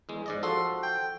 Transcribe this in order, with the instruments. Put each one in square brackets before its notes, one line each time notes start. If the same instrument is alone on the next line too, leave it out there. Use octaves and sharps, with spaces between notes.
[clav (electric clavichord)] E2 G#3
G#2 D5 D#5
[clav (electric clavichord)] F3 F#4 A4 [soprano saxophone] C6
[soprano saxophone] G5